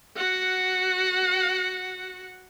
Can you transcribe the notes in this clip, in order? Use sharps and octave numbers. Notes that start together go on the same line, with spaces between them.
F#4 F#5